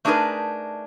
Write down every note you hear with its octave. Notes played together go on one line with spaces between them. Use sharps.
A3 D4 D#4 G#4 A#4 B4